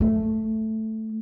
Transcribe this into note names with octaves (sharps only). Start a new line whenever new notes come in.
A3